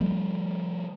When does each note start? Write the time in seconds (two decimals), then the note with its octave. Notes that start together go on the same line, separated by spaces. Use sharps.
0.01 F3 G3 A3